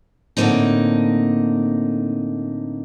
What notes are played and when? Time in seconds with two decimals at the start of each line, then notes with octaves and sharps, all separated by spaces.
0.37 A2 D3 D#3 A#3 C4 D#4